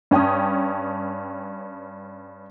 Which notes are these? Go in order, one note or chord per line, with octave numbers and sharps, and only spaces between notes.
G2 C#4 G5 A5 D#6